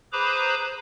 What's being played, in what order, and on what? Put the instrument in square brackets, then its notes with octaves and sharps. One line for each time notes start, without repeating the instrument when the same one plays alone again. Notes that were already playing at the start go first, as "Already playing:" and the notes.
[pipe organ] G#4 B4 C5 A#5 B5 D6